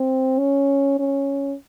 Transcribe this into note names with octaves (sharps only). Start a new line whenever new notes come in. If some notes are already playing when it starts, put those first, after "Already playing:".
Already playing: C4
C#4
C#4